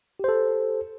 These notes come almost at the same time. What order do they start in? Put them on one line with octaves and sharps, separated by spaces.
G4 C5 A4